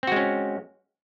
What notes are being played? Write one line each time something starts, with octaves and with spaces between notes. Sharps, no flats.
G#3 C4 C#4 F#4